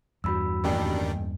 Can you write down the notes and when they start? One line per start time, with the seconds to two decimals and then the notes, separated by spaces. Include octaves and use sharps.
0.24 E2 G2 F#4 B5 E6
0.64 D#1 A1 D#3 G3 D4 G5